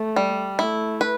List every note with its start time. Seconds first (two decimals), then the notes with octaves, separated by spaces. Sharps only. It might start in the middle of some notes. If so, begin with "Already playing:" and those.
Already playing: A3
0.16 G3
0.59 A3 E4
1.01 B4